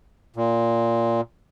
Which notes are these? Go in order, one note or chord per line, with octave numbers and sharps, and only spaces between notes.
A#2